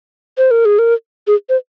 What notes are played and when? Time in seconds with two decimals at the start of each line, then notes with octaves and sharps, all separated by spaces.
0.38 C5
0.51 A#4
0.65 G#4
0.79 A#4
1.27 G#4
1.49 C5